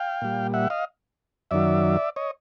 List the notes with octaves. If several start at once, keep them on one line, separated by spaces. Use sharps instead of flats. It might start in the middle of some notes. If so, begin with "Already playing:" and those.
Already playing: F5 G5
A#2 G3
E5 F#5
D#5 F5
F#2 D#3 F#3 D5 E5
C#5 D#5